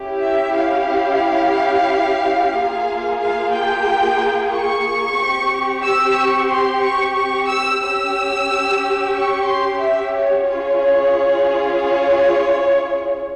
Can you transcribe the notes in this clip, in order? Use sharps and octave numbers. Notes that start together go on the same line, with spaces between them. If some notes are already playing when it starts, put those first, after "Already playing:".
Already playing: C#4 E4 G4
E5
F5
A#3 F4 G#4
F5
G5
C#6
C4 G4
E6
C#6
C6
C#6
C#6
E6
C#4 G4 E6
C#6
C6
E5
C#5
C#4 F4 G#4 C#5
C#5